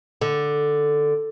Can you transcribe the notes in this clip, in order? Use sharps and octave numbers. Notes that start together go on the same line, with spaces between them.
D3